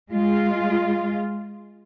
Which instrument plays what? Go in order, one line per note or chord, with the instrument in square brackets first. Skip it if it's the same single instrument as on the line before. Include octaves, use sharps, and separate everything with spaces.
[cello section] G#3 F4